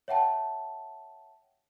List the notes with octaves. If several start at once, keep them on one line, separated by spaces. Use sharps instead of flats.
C#5 E5 F#5 G5 A5